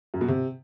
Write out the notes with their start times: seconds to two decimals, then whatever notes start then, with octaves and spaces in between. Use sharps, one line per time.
0.14 F#2
0.21 B2
0.28 C3